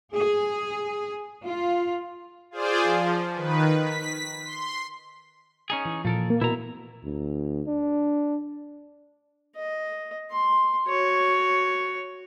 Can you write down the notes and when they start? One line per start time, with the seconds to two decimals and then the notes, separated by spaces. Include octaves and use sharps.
0.14 G#4
1.44 F4
2.51 F4 G#4 C5 D5
2.83 F3
3.35 D#3 B4
3.81 B6
4.44 C6
5.70 C#4 D#4 G#4
5.85 E3
6.05 A#2 F3 A4 A#4
6.30 A#3 A#4
6.41 B2 E4 A#4 A#5
7.04 D2
7.67 D4
9.56 D#5
10.31 C6
10.88 F#4 C#5